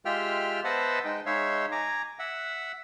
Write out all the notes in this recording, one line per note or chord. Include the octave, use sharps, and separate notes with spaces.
G#3 F4 G4 E5 G5 F6
B3 C5 D#5 E5 F#5 A5
G#3 D#4 G5
G#3 D#4 C#5 E5 F5
G#5 A#5 D6
E5 F#5